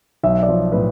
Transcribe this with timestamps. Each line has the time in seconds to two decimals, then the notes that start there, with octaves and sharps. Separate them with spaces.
0.23 B1 E5
0.43 D5
0.49 F3
0.72 A2 B4